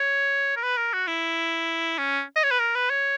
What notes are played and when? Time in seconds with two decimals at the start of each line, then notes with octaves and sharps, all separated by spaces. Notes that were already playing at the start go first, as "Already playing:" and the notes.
Already playing: C#5
0.57 A#4
0.63 B4
0.77 A#4
0.93 F#4
1.07 E4
1.98 C#4
2.36 D#5
2.43 C#5
2.51 B4
2.59 A#4
2.75 B4
2.90 C#5